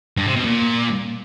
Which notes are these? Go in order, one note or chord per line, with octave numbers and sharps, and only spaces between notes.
G2
C3
B2
A#2